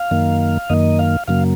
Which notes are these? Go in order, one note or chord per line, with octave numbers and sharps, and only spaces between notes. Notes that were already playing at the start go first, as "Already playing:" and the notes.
Already playing: F5
F#2 D#3 A#3
F#2 D#3 A#3 D#5
F5
F#2 C#3 F#3 A#3 F5